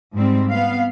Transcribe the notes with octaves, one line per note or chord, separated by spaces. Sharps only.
G#2 G3 C4
B3 F5